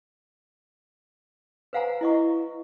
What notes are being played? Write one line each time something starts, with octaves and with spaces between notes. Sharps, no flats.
B4 C5 F5 F#5 G#5 A#5
E4 D#5 C#6